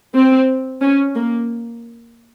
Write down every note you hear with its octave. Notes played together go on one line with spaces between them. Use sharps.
C4
C#4
A#3